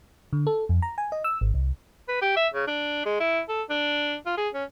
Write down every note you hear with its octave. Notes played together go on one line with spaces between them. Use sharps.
D3
A4
F2
A#5
G#5
D#5
E6
G#1
C2
B4
G4
E5
C#3
D4
G#3
E4
A4
D4
F4
G#4
C#4